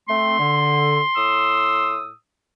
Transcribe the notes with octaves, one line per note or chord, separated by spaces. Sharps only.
A3 C4 C6
D3
A2 D#6 E6